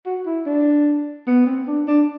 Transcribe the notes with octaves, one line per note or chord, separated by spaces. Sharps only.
F#4
E4
D4
B3
C4
D4
D4